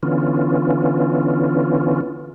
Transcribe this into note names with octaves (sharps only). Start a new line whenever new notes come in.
D3 E3 B3 C#4 F4